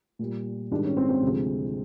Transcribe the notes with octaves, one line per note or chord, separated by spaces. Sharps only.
A#2 G3
G#2 D#3 G3 D4
C#4
C4
C4
D2 C3 F3 G#3